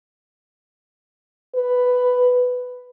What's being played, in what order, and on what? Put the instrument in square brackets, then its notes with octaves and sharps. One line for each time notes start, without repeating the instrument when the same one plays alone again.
[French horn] B4